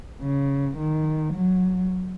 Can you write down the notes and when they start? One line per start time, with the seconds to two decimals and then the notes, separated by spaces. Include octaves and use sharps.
0.22 C#3
0.77 D#3
1.33 F#3